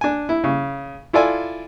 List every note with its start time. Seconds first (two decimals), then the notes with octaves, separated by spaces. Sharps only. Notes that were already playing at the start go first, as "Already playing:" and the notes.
0.01 D4 G#5
0.29 E4
0.44 C#3
1.13 E4 F4 A4 D5 G#5